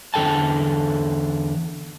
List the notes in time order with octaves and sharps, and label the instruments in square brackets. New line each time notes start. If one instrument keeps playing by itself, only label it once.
[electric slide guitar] E2 D3 A4 G5 A5